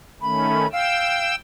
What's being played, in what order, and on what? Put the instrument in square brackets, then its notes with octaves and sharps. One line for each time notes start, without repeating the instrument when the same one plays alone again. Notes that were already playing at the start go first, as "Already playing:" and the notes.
[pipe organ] D#3 A3 C#4 [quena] B5
[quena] F5 [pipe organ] G5 E6